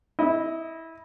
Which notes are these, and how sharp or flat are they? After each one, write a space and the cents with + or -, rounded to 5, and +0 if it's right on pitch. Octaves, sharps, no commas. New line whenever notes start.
E4 -20 D#5 +5